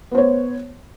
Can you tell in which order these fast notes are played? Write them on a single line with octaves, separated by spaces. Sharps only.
B3 C5 C#5